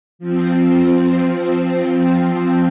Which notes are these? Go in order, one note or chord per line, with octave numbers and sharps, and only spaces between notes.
F3 C4